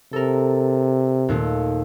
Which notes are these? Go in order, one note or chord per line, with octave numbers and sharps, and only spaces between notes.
C3 A4 A#4
D#2 A#2 A3